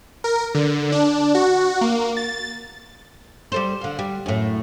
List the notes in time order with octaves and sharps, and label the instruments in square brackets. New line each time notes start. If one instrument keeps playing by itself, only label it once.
[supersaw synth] A#4
D3
D4
F#4
A#3
A6
[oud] G3 A4 C5
D3 F5
G3
F#2 A2